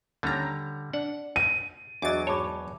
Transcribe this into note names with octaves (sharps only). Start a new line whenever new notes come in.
D#2 D3 G3 C#4 A#5
D4 F#5
D#7
E2 F#3 D4 F#4 D#5 D6 A6
G#2 C#5 A5 B5 D6